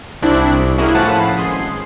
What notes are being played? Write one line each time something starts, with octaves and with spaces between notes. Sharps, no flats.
C2 C4 D4 E4 F#6
C2
A#3 C#4 E4 F#4 G#4
A2 F3 C#4 B4 F#5 A5
C7
G#1 G#4 C6